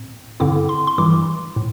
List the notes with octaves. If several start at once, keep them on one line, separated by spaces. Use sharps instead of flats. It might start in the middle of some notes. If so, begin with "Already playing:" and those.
Already playing: A2 C4
G2 D3 C4 E4 D6
C6
C6
G2 E3 G3 E4 D6
A2